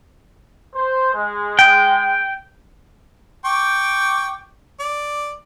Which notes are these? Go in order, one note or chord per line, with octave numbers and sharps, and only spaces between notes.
C5
G#3
G5
G5 C#6 D6
D5